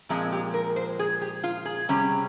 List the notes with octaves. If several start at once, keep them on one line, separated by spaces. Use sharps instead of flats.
A#2 F3 G#3 C4 F4
G4
A#4
C5
G#4
G4
F4
G#4
C3 G3 C#4